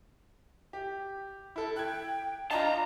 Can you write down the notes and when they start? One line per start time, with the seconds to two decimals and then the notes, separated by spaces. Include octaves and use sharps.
0.73 G4
1.56 E4 A4
1.76 G5 F#6 G#6
2.51 D4 F4 D#5 A5 A#5